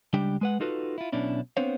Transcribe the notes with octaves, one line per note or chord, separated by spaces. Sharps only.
C#2 G3 D4 G4 G5
G#3 B4 F#5
D#4 F4 F#4 A4 B4
E4 F4
B1 B2 C#4 D4 E4
B3 C4 D4 C5 C#5 F5